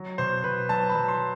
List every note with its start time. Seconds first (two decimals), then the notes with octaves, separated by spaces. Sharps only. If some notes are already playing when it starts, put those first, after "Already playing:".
Already playing: F#3
0.18 B2 C5
0.44 B2 B4
0.69 F#3 A5
0.89 B5
0.95 F#3
1.08 C6